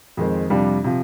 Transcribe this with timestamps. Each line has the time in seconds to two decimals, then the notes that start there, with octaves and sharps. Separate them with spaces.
0.17 F2 D#3 G#3 C4
0.50 F2 C3 G3 D4 F4
0.84 C3 F3